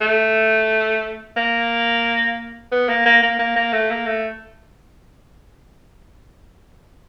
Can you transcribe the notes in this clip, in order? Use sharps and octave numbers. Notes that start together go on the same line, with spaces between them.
A3
A#3
B3
A#3
A#3
A#3
A#3
A#3
A3
A#3
A3